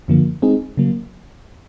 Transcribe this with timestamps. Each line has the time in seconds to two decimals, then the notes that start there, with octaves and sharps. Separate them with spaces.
0.08 F#2 D3 F3 A#3
0.42 G#3 C4 D#4 G#4
0.77 C#3 F#3 A#3